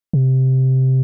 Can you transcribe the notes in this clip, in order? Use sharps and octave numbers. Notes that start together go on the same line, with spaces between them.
C3